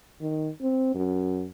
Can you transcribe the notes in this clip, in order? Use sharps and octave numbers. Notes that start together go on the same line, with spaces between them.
D#3
C4
F#2